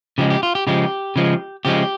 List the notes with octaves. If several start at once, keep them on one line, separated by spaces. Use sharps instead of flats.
C#3 F3 G#3 G4
G4
F4
G4
C#3 F3 G#3 G4
C#3 F3 G#3
C#3 F3 G#3 G4